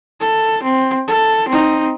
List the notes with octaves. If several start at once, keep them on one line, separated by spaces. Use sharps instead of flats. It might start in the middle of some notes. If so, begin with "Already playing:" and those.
A4
C4
A4
C4 D#4